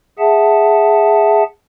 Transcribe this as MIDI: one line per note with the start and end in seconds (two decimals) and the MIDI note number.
0.19 1.43 68
0.19 1.43 76
0.19 1.43 78
0.19 1.43 81